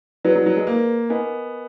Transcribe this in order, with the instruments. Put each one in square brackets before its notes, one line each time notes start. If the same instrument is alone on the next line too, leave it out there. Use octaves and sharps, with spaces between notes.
[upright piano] F#3 [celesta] G#4 B4 D5
[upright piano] F#3
F#3
G#3
A#3
[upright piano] B3 [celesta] A#4 D#5 G#5